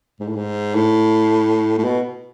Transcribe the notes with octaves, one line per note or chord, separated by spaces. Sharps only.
G#2
A2
G#2
A2
A2
B2